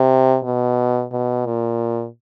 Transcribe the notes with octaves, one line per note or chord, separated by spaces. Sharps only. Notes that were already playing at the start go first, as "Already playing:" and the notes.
Already playing: C3
B2
B2
A#2